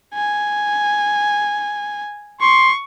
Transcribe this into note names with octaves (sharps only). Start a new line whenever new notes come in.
G#5
C6 C#6